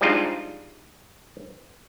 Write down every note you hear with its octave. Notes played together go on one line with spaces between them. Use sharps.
F3 G3 G#3 D4 D#4 F4